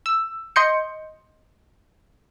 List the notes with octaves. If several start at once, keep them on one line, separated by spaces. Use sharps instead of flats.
E6
D#5 C6 G6 C#7